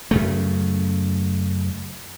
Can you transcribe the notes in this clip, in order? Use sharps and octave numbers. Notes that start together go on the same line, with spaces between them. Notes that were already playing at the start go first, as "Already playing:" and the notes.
F#2 C#3 A3